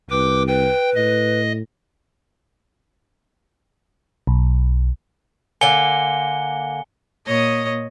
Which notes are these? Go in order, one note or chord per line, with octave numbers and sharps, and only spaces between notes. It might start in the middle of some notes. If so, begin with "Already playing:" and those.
C2 B4 G5 D6
B4 G5
A2 D#5
B1
D3 A#3 G#5 C#7 G7
A#2 C#5 D#5 D#6